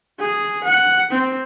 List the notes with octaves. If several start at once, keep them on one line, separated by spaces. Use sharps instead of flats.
G#4
F#5
C4